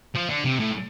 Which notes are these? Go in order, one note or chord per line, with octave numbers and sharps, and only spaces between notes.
F3
D3
C3
A2